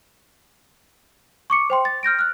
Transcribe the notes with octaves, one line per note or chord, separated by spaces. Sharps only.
C#6 D6 C#7
C5 G5 C6
A6
F6 G6 A#6 D7
F6 F#6